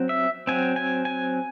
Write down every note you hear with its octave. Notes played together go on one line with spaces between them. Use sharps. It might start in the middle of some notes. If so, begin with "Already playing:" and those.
Already playing: F#3 C4
E5
F#3 C4 G#5
G#5
G#5